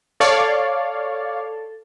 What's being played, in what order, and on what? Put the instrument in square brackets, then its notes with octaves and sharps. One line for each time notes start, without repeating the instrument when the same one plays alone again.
[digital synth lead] A4 [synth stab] C#5 D5 F5